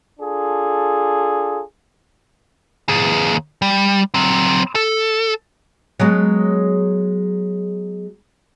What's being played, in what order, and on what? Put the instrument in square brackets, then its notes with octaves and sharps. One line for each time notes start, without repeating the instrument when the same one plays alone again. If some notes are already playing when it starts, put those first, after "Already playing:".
[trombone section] D4 F4 G#4 A4
[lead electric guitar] D#2 G#4
G3
F#3 C4
A4
[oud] F#3 G#3 B3